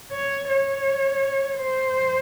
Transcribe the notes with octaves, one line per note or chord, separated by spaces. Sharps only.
C#5
C#5
C5